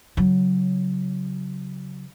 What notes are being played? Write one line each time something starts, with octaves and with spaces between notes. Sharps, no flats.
C#3 F#3